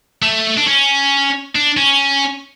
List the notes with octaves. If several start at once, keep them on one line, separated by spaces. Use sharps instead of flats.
A3
D4
C#4
D4
C#4